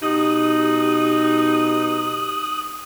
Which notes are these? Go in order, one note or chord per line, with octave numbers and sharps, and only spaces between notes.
B2 D#4 G4 D#6 F#6